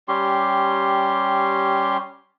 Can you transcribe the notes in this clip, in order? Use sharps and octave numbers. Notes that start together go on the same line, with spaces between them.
G3 C#4 G4 C6